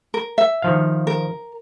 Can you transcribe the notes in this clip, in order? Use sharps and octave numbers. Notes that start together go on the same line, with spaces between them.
A#4
E5
D#3 F3 F5
A#4